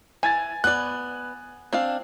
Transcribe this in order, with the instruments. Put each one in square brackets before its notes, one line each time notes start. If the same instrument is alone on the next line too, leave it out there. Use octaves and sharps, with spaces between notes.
[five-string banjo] E3 [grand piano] G#5 G#6 A6
[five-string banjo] B3 D5 [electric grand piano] F#6
[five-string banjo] C4 D4 F5